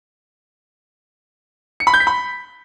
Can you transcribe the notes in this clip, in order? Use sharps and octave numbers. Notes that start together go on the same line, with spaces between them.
C#7
B5
G6
B6
B5